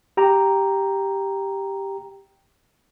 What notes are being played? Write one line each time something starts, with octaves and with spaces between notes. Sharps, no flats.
G4 G5 A#5